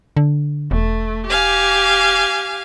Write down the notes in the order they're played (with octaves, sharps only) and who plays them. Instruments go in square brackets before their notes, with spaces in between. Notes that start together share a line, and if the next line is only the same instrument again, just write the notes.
[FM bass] D3
[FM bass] E1 [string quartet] A3
[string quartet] G4 F5 G#5